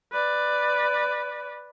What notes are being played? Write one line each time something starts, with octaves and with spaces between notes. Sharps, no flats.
B4 D5